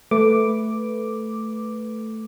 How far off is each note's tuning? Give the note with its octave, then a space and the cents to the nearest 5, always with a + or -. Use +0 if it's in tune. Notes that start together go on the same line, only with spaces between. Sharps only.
A3 +0 B4 +0 D6 +0